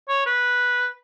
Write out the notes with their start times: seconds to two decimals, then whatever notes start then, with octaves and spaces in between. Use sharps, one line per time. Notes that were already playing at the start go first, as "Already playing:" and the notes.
0.09 C#5
0.26 B4